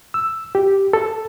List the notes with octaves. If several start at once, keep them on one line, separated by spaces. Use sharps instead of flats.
E6
G4
A4